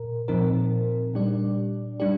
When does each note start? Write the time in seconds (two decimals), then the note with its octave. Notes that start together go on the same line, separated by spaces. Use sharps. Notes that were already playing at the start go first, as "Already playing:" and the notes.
Already playing: A#2 A#4
0.28 A#2 F3 C4 D#4 A#4
1.14 A#2 G3 D4 G4 D5
2.00 G3 D4 G4 D5